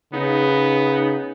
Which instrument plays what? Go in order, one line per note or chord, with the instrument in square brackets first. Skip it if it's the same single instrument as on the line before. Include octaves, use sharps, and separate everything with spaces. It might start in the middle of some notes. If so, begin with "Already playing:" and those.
[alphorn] C#3 [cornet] B3 [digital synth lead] D#4